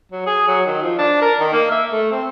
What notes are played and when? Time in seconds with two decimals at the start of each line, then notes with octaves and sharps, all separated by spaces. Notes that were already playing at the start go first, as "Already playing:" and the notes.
0.12 F#3
0.26 G#4
0.48 F#3
0.66 D#3
0.82 F3
0.98 D4
1.21 A#4
1.40 D#3
1.53 A#3
1.71 E5
1.92 A3
2.12 C4